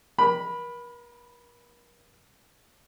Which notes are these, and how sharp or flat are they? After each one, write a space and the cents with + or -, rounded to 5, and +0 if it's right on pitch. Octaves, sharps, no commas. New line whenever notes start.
A#4 +40 B5 +0